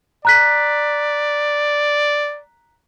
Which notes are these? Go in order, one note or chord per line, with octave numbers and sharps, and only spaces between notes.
D5 A#5 F#6 B6